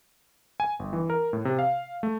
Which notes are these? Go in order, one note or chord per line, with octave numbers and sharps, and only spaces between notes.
G#5
G1
E3
A#4
A2
C3
F5
A3